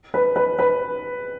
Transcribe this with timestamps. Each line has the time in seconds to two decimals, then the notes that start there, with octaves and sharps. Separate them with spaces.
0.14 B4
0.36 B4
0.59 B4